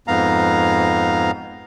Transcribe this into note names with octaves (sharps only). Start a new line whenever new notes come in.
F2 G#2 B3 F5 A#5